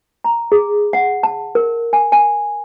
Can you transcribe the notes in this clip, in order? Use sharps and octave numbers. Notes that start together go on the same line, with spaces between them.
A#5
G#4
F#5
A5
A#4
G#5
G#5